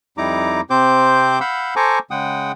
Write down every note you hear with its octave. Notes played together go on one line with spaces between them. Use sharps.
F2 G3 D#4 E4 A#5 D6
C3 C4 C5 D6 G6
F5 F#5 B5 E6 G6
A4 C5 G#5 A#5 C#6 D6
C#3 G#3 F#5 G5 D#6